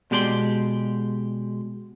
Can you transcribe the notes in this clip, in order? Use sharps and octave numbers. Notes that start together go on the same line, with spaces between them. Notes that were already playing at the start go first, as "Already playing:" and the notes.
B2 G#3 G4 D5 A#5 C6